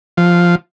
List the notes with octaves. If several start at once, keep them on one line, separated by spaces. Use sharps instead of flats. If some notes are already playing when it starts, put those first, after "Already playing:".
F3